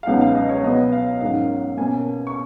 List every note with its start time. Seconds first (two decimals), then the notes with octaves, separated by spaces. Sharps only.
0.03 F5
0.07 C#2 B2 F#3 B3 D#4 F#5
0.21 F5
0.35 D#5
0.49 C#5
0.63 B2 F#3 B3 D#5
0.92 F5
1.20 G#2 D#3 F#3 C#4 F5
1.77 B2 A#3 C#4 G#5
2.27 C#6